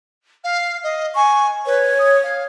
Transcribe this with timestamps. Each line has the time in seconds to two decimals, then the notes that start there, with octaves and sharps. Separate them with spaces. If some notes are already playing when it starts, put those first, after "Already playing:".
0.44 F5
0.83 D#5
1.15 G#5 C#6
1.66 B4 C#5
1.98 D#6
2.23 F5